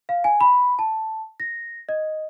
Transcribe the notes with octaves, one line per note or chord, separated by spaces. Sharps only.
F5
G#5
B5
A5
A#6
D#5